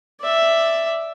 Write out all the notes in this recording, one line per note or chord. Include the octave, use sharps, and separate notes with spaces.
D5 E5